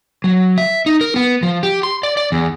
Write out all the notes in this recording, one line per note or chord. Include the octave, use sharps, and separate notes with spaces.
F#3
E5
D#4
A#4
B3
F3
G4
C6
D5
D5
E2